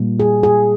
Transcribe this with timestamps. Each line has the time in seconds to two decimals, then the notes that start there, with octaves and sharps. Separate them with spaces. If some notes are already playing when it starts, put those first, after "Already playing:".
Already playing: A#2 G3 A#3
0.20 G#4
0.43 G#4